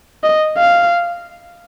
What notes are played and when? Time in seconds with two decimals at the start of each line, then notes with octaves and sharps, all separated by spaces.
0.24 D#5
0.58 F5